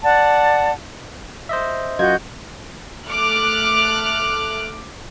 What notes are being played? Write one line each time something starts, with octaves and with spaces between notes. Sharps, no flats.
D5 F#5 A5
C5 D#5 E5
F#2 F4 F#4 D#5 G6 G#6
A3 D6 F6 F#6